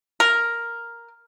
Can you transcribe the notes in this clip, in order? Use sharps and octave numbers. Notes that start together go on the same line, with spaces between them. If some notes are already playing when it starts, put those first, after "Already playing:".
A#4